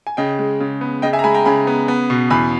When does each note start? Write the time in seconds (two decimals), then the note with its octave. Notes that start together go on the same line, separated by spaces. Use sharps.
0.07 G#5
0.17 C#3 D#5 G5
0.39 G#3
0.60 C#3
0.81 B3
1.02 C#3 D#5 G5
1.13 E5 G#5
1.19 A#5
1.24 G#3 G#5 B5
1.34 G5 A#5
1.45 C#3 G#5 B5
1.67 B3
1.88 B3
2.10 B2
2.30 E2 G#5 B5